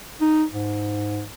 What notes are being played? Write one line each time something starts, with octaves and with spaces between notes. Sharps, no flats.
D#4
G#2